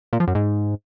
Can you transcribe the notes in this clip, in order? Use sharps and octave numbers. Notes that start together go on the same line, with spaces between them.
A#2
F3
F#2
G#2